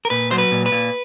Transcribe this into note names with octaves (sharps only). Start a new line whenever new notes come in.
A#4
A#2 B4
F#3 C5
B4
A#2
B4
A#2